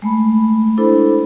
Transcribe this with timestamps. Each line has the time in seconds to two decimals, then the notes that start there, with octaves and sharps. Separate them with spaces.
0.02 G#3 A3 B5
0.77 D4 E4 A4 C5 B5